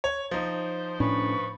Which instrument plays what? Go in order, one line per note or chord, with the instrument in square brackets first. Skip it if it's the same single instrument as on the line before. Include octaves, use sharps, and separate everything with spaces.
[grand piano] C#5
[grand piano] F3 D#4 [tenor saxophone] C5
[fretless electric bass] A2 C#4 D4 [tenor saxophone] B4 [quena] C#6